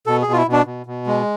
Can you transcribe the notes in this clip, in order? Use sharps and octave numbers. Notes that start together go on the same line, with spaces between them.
B2 A4
B2 G#4
F4
E4
B2
D4
B2
B2
G#3